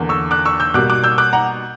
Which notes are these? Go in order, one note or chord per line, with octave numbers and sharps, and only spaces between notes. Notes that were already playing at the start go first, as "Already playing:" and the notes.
Already playing: E2 D3 A#3
C#6 E6
D6 F#6
C#6 E6
E6 G6
B2 G3 A#3 D6 F#6
D6 F#6
E6 G6
D6 F#6
F#5 A#5